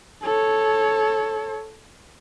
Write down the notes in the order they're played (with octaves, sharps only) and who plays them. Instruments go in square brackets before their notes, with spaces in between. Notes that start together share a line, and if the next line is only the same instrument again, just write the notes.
[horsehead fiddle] A4 C#5